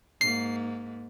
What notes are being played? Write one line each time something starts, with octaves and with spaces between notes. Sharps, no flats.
G#2 A#3 C7